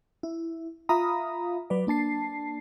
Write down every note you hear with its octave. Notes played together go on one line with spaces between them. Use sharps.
E4
F4 E5 F5 A#5 B5 D#6
F#3 B4 D5
A#3 D4 A5 C7